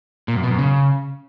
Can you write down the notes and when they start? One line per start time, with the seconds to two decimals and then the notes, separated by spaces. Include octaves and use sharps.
0.28 A#2
0.36 F#2
0.43 B2
0.51 F#2
0.58 C#3